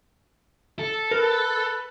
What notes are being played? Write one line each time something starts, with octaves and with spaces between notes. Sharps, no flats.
A4
A#4 B4